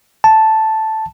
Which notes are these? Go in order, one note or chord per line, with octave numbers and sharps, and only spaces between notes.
A5